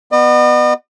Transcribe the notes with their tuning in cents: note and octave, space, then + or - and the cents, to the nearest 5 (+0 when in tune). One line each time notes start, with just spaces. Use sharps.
B3 +0 D#5 -45